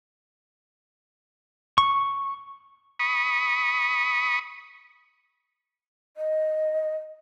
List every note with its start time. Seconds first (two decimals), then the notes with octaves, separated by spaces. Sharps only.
1.78 C#6
2.99 B5 C#6 D#6
6.17 D#5